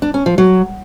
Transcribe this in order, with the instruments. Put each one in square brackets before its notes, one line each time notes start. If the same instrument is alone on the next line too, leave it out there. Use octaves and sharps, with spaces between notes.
[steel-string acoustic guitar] D4
C#4
F3
F#3